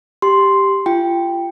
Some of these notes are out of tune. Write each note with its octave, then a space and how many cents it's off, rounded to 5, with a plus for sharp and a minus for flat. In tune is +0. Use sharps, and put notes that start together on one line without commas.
G4 +0 C6 +0
F4 -35 G5 +0